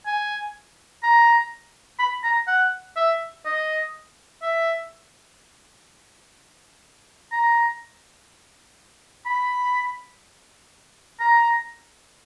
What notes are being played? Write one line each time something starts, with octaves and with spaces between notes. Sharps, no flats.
G#5
A#5
B5
A#5
F#5
E5
D#5
E5
A#5
B5
A#5